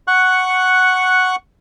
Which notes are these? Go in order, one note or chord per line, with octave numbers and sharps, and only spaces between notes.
F#5 C#6 F#6